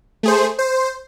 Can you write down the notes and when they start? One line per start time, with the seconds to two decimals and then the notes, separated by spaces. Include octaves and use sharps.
0.23 A3 G#4 C5
0.59 C5